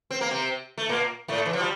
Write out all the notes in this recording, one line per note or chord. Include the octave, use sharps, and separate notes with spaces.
C4
A#3
C3 C4
A3
A#2 A#3
A2 A3
E3
F3
G3